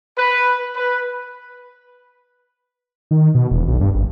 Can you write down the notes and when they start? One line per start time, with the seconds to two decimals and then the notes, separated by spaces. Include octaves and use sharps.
0.18 B4
0.76 B4
3.11 D#3
3.35 B2
3.51 E1
3.68 B1
3.81 G2
3.95 G#1